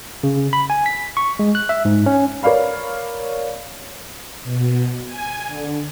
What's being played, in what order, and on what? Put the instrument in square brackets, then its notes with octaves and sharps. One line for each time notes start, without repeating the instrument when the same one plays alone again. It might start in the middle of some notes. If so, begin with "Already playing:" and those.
[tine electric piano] C#3
B5
G#5
B6
C#6
G#3
F#6
E5
G#2
C#4
[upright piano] A#4 C#5 D5 F5 B5
[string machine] B2
G#5
D3